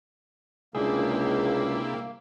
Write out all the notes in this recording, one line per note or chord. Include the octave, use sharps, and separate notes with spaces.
C#2 C3 G3 A#3 D4 E4 G#4